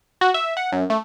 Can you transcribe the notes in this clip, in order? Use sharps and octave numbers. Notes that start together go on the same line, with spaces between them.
F#4
E5
F#5
F#2
A3